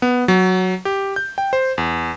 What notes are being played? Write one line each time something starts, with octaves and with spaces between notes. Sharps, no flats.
B3
F#3
G4
G6
G5
C5
E2